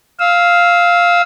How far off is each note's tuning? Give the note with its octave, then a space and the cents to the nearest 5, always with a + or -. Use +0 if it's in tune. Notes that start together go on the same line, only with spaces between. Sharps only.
F5 +0 E6 -25